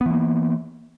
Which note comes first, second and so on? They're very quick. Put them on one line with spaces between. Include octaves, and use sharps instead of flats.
B3 E3 A#3